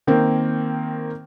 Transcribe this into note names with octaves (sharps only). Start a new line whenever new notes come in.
D#3 A#3 C4